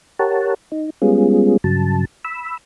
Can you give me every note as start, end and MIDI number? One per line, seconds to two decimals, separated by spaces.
0.19 0.54 67
0.19 0.54 70
0.19 0.54 73
0.19 0.54 78
0.19 0.54 81
0.72 0.90 63
1.02 1.57 55
1.02 1.57 56
1.02 1.57 59
1.02 1.57 61
1.02 1.57 65
1.02 1.57 68
1.64 2.05 43
1.64 2.05 49
1.64 2.05 54
1.64 2.05 81
2.25 2.57 83
2.25 2.57 88